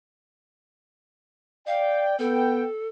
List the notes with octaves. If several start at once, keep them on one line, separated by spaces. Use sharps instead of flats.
D5 F5 G5
B3 A4 G5